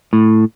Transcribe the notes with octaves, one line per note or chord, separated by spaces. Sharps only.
A2